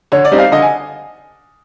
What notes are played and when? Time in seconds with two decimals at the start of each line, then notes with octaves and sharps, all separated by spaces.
0.12 D3 C#5
0.25 D5
0.31 G3 C4 D#4
0.39 F5
0.52 D3 D#5
0.62 G#5